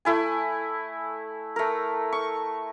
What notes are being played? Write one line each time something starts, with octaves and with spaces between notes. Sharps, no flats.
A3 E4 G#5
A3 A#4
C#6